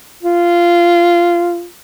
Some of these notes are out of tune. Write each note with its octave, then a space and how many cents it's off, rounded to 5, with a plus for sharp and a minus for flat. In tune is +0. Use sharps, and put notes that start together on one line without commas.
F4 -15